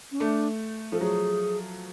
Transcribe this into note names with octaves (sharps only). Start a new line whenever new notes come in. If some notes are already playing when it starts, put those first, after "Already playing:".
C#4
A3 D4
F3 A4
F#3 G#4